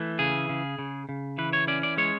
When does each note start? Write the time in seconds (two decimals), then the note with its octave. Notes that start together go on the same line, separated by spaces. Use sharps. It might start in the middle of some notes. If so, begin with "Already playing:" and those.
Already playing: E3 A3
0.19 C#3 G#4
0.49 C#3
0.79 C#3
1.09 C#3
1.38 E3 B4
1.53 C#5
1.68 C#4 D5
1.83 D5
1.97 G#3 C#5